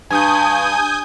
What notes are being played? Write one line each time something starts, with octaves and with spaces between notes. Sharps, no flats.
G2 G#5 D#6 G6